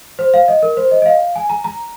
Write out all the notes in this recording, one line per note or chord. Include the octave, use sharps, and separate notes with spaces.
C5
F5
D#5
A#4
C5
D#5
D#5
F5
G#5
A#5
A#5